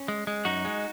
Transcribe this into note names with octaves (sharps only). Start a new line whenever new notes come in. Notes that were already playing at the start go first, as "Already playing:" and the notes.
Already playing: C#4
G#3
G#3
F#2 D#4 F#4
G#3